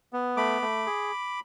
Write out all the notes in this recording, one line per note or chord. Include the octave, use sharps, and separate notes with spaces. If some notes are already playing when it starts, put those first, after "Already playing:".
B3
A3 B5 D6
A3
G#4